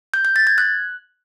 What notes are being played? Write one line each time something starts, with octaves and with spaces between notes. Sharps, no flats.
G6
G6
A6
G#6
F#6